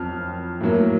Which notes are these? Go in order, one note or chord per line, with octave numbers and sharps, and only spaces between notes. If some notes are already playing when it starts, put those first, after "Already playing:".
Already playing: F2 F#3 F6
A2 F#3 A#3